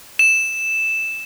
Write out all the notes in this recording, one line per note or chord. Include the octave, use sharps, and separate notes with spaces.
E7